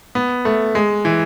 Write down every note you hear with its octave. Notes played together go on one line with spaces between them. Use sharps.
B3
A3
G#3
E3